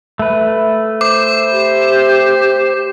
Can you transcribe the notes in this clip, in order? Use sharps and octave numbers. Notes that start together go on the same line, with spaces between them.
A3 B4
C5 D6
G4